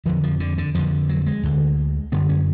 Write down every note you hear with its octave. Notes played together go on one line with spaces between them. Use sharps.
F2 D3 F3
F3
D3
D3
F2 D3 F3
F#3
G#3
D2 D3
F#2 D3 B3
C#4